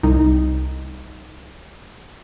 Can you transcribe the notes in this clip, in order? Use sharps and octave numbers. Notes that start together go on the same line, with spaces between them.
C2 D#4